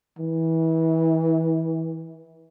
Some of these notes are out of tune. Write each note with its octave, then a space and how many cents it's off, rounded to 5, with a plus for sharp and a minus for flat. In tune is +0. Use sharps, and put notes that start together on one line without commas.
E3 -25